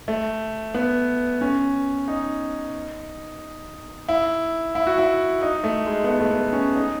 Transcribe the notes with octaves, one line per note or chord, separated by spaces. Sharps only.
A3
B3
C#4
D#4
E4
E4
F#4
E4
D#4
A3
G#3
B3
A3
A3
B3
C#4
D#4